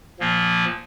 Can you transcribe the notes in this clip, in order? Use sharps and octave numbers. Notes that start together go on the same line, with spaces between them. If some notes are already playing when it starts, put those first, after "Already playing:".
A#2 F3 A#3